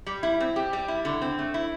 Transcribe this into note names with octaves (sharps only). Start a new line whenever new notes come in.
G3
E4
C4
G4
G3
E4
D3
C4
A3
E4